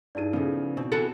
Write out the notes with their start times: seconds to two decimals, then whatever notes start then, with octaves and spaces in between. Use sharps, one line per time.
0.15 G2 D#4 E4 G#4 D5 D#7
0.33 C#3 F3 A3 B3 G#4
0.77 B2 C4
0.92 E3 F#4 A4 C#7